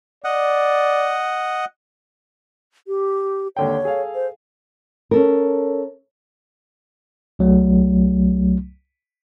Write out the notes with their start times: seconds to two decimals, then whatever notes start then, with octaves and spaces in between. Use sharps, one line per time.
0.24 D5 D#5 F#5
2.88 G4
3.56 D#2 D3 C#5 G5
3.85 G#4 A4 F5
4.15 C5
5.11 C#4 A4 A#4
7.39 C2 F#3 A3